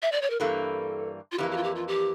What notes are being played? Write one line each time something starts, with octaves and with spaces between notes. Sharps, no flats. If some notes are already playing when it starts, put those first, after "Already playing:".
E5
D5
C#5
A#4
G2 E3 G3 A#3 A4
F4
F2 E3 A#3 G4
G4
F4
G4
F4
G4